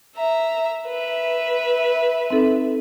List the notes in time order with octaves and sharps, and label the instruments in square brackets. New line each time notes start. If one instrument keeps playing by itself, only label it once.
[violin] E5 A#5
B4 E5
[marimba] C4 D#4 A4